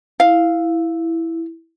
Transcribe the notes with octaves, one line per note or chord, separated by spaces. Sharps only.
E4 F5